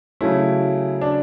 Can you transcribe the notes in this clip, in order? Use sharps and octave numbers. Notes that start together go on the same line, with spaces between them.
C#3 F#3 A3 C#4 E4
D4